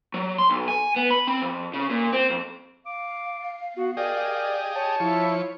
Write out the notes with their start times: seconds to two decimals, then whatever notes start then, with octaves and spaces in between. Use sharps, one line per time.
0.14 F#3
0.38 C6
0.50 B1
0.68 G#5
0.96 B3
1.10 B5
1.27 C4
1.42 F2
1.74 C#3
1.90 A#2
2.13 C4
2.30 F2
2.86 F5 D6
3.77 B3 F#4
3.97 G4 G#4 A#4 D5 D#5
4.76 C#5 A5
5.00 F3 E4 C#6